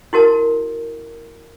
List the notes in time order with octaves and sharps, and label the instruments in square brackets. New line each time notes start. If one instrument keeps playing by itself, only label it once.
[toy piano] E4 F#4 A#4 A5